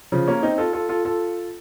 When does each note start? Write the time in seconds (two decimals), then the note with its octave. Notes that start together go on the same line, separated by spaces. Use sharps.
0.12 C#3 F3
0.28 A#3 C#4
0.43 C4 D#4
0.58 F4 A4
0.73 F4 A4
0.89 F4 A4
1.05 F4 A4